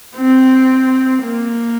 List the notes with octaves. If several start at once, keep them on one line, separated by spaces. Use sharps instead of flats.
C4
A#3